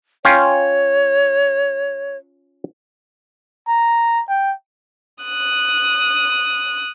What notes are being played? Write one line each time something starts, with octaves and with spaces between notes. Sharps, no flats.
C#4 F4 C#5 G5
A#5
G5
D#6 F#6